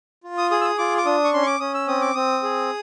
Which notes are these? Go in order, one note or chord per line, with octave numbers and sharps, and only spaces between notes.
F4
D#6
G#4 D#6
E6
D#6
F4 D6
D6
D4 D#6
C#6
C#4 C6
C#6
D6
C#4 D#6
E6
C4 D#6
D6
C4 D#6
G#4